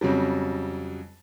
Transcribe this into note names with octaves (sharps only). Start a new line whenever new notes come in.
F2 C#3 F#3 G3